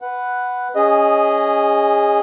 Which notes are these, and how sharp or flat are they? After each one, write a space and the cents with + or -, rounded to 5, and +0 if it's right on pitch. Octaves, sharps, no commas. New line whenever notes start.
B4 +0 F#5 +0
C#4 +10 G#4 -20 D#5 +0